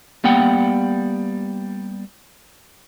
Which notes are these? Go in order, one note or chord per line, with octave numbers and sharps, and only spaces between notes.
G3 A#3 B3 F#5 G5